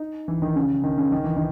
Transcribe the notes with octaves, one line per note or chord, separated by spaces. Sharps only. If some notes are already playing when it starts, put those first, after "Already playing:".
Already playing: D#4
E3
D#3
C#3
D#3
C#3
D#3
E3
D#3